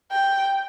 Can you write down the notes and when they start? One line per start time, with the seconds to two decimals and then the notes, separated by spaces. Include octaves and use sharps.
0.12 G5